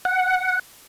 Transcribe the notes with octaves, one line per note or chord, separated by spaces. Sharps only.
F#5